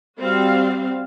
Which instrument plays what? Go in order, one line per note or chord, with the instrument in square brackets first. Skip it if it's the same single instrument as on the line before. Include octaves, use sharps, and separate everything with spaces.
[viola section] G3 C4 F#4 F5